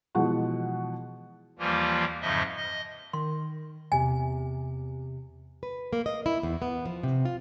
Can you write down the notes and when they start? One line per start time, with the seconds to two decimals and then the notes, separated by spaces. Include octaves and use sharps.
0.15 B2 E3 F3 G#3 F#5 C#6
1.59 D#2 E3 F3 G3 A#3 F4
2.21 F2 G#2 C#3 F3 D#5 E5
2.57 D#5
3.13 D#3 C6
3.92 E2 C3 G#5
5.63 B4
5.93 A#3
6.06 D#5
6.26 E4
6.43 E2
6.62 B3
6.85 F3
7.03 C3
7.25 F4